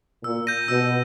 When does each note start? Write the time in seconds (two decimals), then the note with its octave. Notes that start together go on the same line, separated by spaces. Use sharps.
0.24 A#2 E6
0.47 G6 A#6 D#7
0.68 B2 E6